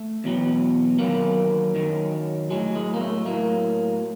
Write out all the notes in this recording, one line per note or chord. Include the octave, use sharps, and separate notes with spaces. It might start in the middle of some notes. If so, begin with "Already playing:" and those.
Already playing: A3
E2 B2 F#3
F#2 D#3 F#3 A#3
F#2 D#3 F#3
A2 F#3 G#3
G#3
A#3
A3
A2 F#3 A#3